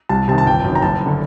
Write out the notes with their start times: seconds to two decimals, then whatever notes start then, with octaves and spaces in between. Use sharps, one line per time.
0.09 C2 A5
0.28 C3 A5
0.31 D#3
0.38 A5
0.46 G1 G5
0.64 F#2 D#3
0.75 A#5
0.82 F#1 A5
1.06 D3